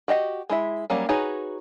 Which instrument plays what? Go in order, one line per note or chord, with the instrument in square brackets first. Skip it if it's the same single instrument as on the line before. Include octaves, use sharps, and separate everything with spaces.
[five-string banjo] F#4 G4 D#5 F#5
G#3 E4 E5
F#3 G3 A#3 C#4
D#4 F#4 G#4 B4 C#5